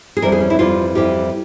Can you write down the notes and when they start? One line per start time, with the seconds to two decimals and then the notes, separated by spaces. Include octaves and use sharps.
0.17 G#4
0.22 F2 E3 G3 A#4
0.32 G#4
0.40 C#4
0.50 E4
0.59 F2 E3 G3 F4
0.95 F2 E3 G3 G4